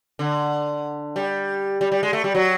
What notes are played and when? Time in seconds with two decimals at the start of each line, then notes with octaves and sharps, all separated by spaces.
0.19 D3
1.16 G3
1.81 G3
1.92 G3
2.03 G#3
2.13 A3
2.24 G3
2.35 F#3